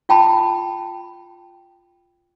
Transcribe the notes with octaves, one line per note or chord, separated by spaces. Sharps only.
F4 G5 A5 B5